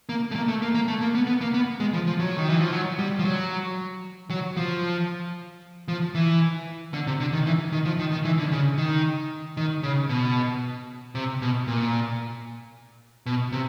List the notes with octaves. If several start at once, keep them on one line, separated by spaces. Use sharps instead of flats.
A#3
A3
A#3
A3
A#3
A#3
A3
A#3
B3
B3
A#3
B3
G#3
F3
F3
F#3
D#3
E3
F3
F#3
G3
F3
F#3
F#3
F3
F3
E3
D3
C3
D3
D#3
E3
D#3
F3
D#3
D#3
E3
D3
C#3
D#3
D#3
C#3
B2
C3
B2
A#2
B2
C3